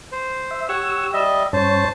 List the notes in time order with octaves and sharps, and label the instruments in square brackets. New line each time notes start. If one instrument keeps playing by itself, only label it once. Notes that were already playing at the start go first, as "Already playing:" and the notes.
[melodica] C5
[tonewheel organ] E5
[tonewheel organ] G4 E6 [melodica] C#5 F#5 C#6
[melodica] G3 D#5 E5
[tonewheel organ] G2 C#4 C#5 [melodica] C5 A5